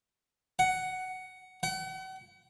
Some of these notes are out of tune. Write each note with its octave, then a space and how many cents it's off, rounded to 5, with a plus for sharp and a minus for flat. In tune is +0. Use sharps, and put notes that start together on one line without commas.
F#5 +10
F#5 +40